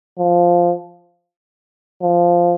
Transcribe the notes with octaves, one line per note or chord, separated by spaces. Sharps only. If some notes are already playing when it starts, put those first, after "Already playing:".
F3
F3